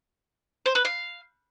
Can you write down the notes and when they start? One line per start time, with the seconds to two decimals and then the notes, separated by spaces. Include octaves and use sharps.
0.66 C5
0.75 B4
0.85 F5